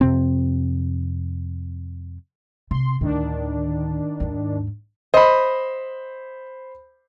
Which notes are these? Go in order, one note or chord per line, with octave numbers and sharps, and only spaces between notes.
F2 C3 C4
C3 C6
D2 A2 D#3 D4
D#2 G#2
C5 D#5 B5